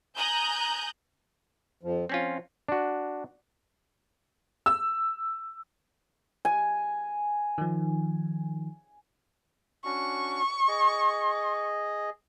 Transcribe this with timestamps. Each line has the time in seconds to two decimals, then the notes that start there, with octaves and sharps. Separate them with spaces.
0.17 G#5 A#5 D#6 F#6 G6
1.83 F2 F3
2.09 F3 C4 C#4 F4
2.69 D4 F#4
4.66 E6
6.45 G#5
7.58 D#3 F3
9.85 C#4 D4 F#4 C#6
10.68 G#4 D#5